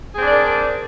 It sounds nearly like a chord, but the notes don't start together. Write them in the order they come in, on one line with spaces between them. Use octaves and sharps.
G#4 C4 D4 D5 A#4